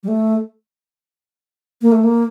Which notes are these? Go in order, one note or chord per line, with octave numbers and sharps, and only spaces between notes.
G3
A3
A#3
A3
A#3